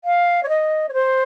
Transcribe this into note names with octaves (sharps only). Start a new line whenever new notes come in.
F5
C#5
D#5
C#5
C5